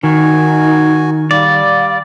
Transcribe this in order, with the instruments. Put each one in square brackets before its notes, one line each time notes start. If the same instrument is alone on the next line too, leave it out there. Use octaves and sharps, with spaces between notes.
[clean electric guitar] D#3 [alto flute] D#4 [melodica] F#4 G#5
[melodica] G3 [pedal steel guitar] D5 [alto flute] F5